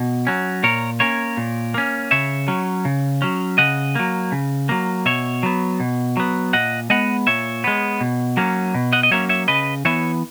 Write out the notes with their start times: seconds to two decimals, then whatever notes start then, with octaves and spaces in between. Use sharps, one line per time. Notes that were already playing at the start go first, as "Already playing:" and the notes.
Already playing: B2
0.27 F#3 C#4
0.63 A#2 A#4 C#5
1.00 A#3 C#4 A#4 C#5
1.37 A#2
1.74 A#3 C#4
2.11 C#3 C#5 E5
2.48 F#3 C#4
2.85 C#3
3.22 F#3 C#4
3.58 C#3 D#5 F#5
3.95 F#3 A#3
4.32 C#3
4.69 F#3 A#3
5.05 B2 C#5 E5
5.43 F#3 B3
5.80 B2
6.17 F#3 B3
6.53 A#2 D#5 F#5
6.90 G#3 B3 D#5 F#5
7.27 A#2 C#5 E5
7.64 G#3 B3
8.01 B2
8.37 F#3 A#3 C#4
8.74 B2
8.93 D#5 F#5
9.03 D#5
9.11 F#3 A#3 C#4 C#5 E5
9.29 C#5 E5
9.48 C#3 B4 D#5
9.85 E3 B3 C#5 E5